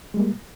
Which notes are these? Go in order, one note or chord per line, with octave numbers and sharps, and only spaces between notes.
G3 G#3 A#3